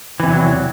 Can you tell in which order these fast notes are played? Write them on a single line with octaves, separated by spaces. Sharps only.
E3 C3 E2 F#3